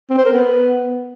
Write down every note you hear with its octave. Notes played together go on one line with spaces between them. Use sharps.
C4
C5
A#4
B3